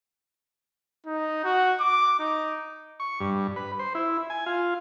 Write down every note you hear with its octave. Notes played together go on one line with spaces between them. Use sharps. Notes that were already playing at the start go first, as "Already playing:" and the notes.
D#4
F#4
D6
D#4
C#6
G2
B4
C5
E4
G#5
F4